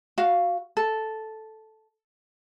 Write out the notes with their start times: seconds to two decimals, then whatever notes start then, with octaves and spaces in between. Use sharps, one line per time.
0.18 F#4 F5
0.77 A4